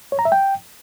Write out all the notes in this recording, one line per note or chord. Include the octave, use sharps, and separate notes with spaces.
C#5
A#5
E5
G5